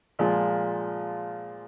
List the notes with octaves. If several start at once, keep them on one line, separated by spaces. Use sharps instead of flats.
A#2 F3 G#3